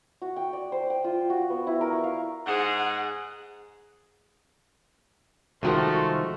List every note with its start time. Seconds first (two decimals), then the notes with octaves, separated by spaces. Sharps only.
0.22 F#4
0.36 G5
0.53 D5
0.72 C5
0.90 G5
1.04 F4
1.30 F#4
1.50 B3
1.67 E4
1.81 A#4
1.92 C#6
2.04 F5
2.46 G#2 G#4 F#5
5.63 C2 D#3 F3 G#3 A3 F#4 A#4 C6